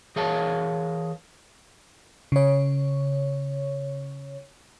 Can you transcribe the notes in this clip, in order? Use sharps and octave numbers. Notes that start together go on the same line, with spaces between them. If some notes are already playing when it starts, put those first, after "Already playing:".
E3 G#4 A#4 C#5 F5 A5
C#3 C#5